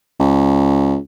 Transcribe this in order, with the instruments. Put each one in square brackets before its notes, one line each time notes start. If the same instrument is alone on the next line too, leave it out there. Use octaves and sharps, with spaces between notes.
[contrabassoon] C#2